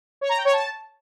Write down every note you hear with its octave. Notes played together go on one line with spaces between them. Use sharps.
C#5
A#5
G5
C#5
A5